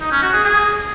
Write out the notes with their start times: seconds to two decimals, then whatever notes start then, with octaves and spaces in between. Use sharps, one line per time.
0.01 D#4
0.12 C#4
0.22 F#4
0.33 G#4
0.44 G#4